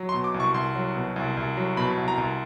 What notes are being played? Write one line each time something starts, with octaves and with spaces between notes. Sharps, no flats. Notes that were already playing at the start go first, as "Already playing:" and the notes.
Already playing: F#3
C6
B2
D6
C2
C#6
C2 C6
F#3
B2
C2
C2
F#3
B2 B5
C2
A#5
C2